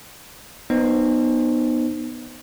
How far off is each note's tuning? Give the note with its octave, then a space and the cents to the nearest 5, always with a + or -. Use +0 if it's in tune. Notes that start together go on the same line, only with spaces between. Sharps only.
B3 -10 D#4 -20 C5 +0